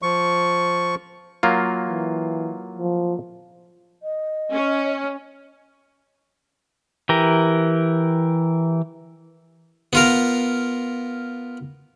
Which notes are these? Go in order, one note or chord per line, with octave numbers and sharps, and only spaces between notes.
F3 C#6
F#3 A#3 F4
E3
F3
D#5
C#4
E3 G4 A#4
B3 F4 A#4